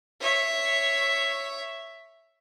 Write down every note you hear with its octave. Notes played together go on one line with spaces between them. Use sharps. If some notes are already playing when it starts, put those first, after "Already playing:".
C#5 E5